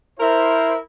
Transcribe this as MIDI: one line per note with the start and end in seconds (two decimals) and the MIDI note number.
0.19 0.76 64
0.19 0.76 70
0.19 0.76 72